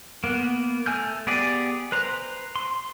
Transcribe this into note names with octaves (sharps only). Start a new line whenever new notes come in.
A#3 B3
A3 G#5 F6 G6
B3 G4 G#4 D5
B4 C5 A#5
C6